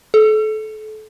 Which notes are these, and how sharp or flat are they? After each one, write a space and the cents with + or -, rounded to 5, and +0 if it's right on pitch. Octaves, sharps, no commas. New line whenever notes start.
A4 -30